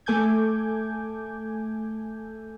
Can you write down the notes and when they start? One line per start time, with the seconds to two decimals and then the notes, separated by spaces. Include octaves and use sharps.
0.06 A3 A4 G#5 D6 G6 G#6